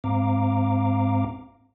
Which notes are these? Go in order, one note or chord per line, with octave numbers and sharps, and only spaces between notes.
G#2 C4 F5 A#5 D6